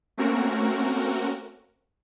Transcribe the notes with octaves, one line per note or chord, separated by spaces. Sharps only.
A3 A#3 C4 C#4 F#4 A#4